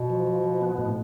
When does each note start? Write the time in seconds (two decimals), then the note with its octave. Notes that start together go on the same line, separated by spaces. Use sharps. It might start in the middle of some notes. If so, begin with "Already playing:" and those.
Already playing: B2
0.10 F3
0.27 F3
0.44 F3
0.61 B3
0.78 A2